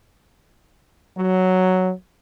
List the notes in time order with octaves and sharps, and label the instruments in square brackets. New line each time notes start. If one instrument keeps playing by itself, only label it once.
[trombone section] F#3